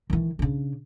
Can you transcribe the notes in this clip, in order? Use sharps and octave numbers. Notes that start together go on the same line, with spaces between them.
D#3 E3
C#3 D4